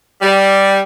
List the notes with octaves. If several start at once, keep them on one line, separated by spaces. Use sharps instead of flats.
G3